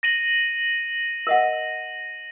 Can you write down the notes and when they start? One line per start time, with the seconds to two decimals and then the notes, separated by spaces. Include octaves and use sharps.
0.03 A#6 D#7 F#7
1.27 A#4 D#5 F#5